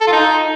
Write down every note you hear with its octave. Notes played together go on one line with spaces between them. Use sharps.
A4
F4
D#4